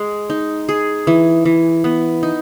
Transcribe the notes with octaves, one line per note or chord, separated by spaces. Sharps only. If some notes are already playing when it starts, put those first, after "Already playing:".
Already playing: G#3
D#4
G#4
E3
E3
B3
D#4